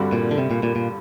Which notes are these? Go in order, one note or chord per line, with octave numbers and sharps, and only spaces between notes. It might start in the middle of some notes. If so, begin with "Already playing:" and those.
Already playing: G2 D3 G3 C4 F#4
A#2
D3
C3
A#2
A#2
A#2